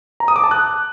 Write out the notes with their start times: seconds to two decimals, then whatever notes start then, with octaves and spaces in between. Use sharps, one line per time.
0.20 A#5
0.28 D#6
0.36 D6
0.44 A5
0.51 F#6